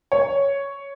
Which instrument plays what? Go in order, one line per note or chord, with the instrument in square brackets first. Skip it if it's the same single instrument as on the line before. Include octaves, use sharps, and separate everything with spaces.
[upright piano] C#5